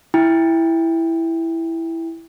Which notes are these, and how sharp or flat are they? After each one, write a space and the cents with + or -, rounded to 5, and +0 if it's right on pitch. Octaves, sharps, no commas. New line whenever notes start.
E4 +0 G5 +25